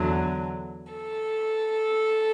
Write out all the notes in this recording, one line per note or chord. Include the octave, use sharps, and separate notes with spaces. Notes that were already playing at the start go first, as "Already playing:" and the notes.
Already playing: E2 D3 F#3
A4